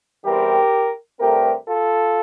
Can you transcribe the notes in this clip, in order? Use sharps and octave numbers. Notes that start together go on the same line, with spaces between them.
E2 E3 G3 C4 G4 A#4
G2 D3 A3 C4 G4 A#4
F4 A4